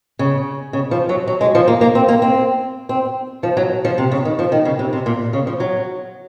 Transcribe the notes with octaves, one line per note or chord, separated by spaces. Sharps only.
C#3
C#3
F3
F#3
F#3
G#3
F3
A#3
A#3
C4
A#3
C4
C4
F3
F#3
F3
C3
C#3
D#3
F3
D#3
C#3
C3
C3
A#2
C#3
F3
F#3